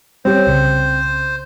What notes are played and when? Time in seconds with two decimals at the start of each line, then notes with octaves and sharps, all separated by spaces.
0.25 G3 C4 G4 C5 C#5
0.46 C2 C#3